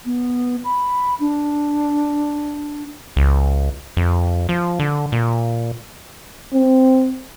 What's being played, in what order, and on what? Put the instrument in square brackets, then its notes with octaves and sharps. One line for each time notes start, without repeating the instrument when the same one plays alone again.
[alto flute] B3
B5
D4
[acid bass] C#2
F2
F3
D3
A#2
[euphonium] C4